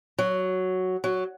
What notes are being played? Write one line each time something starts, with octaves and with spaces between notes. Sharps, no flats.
F#3
F#3